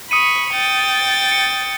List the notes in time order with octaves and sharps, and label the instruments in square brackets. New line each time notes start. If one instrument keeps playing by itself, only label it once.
[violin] B5 C#6 [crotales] D#6 C#7 D#7
[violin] G5 A6
[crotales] C#7